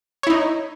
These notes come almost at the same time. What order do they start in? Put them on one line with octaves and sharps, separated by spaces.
C#5 E4 D#4